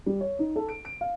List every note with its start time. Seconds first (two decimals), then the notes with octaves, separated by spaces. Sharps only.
0.06 G3
0.21 C#5
0.39 D#4
0.56 A4
0.68 D7
0.85 D7
1.01 F5